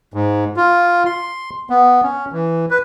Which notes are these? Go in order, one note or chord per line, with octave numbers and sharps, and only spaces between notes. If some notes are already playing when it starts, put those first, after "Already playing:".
G#2
F4
C6
B3
C#4
E3
B4